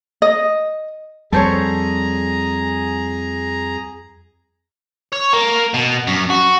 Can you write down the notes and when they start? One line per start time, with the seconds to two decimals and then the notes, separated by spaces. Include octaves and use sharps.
0.22 D#5
1.32 F2 G3 G#4 A4 C5 C#5 A#5
5.13 C#5
5.33 A#3
5.74 B2
6.07 F#2
6.30 F#4